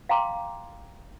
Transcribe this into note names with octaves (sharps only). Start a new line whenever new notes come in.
F5 G5 A#5 C6 D6